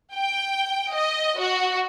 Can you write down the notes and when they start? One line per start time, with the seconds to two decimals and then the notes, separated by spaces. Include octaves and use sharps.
0.14 G5
0.94 D#5
1.39 F#4